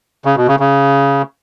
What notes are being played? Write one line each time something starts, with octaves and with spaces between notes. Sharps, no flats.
C#3
B2
C#3
C#3